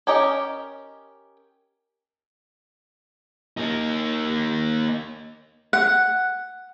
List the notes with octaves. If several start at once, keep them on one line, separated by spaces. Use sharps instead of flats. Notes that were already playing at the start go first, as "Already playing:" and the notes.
C#4 G4 A#4 D#5
A#3 D#4
F#5